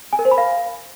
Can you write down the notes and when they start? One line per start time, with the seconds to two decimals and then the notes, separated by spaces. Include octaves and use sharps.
0.13 G#5
0.19 A#4
0.25 C5
0.31 B5
0.38 F5